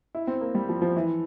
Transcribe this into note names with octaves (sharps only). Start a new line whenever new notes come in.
E4
C4
A#3
G3
F3
F3
E3